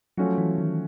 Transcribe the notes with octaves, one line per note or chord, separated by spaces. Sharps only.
F3 F#3 A3 C#4 F#4
E3
D#3